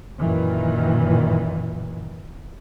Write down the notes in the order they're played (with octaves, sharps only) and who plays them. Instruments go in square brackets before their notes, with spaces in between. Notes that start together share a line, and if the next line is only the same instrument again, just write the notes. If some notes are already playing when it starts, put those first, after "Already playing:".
[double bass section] F#2 A#2 D#3 E3